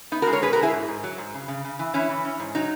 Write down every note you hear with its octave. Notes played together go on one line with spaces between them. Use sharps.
B3 D#4
F#4 A#4
G#3
A#4 C#5
B2 G#4 B4
F#4 A#4
G#3
E4 G#4
G#2
G#2
F#3
G#2
C#3
C#3
C#3
E3
E3 C#4 E4
E3
C#4
G#2
F#3 D#4